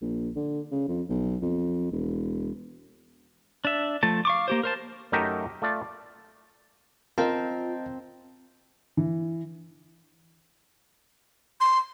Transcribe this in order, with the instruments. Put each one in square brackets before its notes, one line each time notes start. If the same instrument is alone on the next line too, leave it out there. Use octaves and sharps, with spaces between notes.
[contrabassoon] A#1
D3
C#3
F2
B1
F2
E1
[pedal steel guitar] D4 E5
F3 A3 A5
F5 C#6 D6
A#3 G4 C5
A#4 C5 A5
[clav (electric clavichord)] F#2 A3 D#4 G4 A#4 E5
A3 F4 D5 A5
[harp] C4 [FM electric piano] F4 [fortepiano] A#4 [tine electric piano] D#5 A5
[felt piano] E3
[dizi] C6